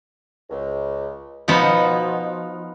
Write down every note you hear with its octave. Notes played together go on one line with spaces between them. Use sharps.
C#2
B2 F3 B3 D#4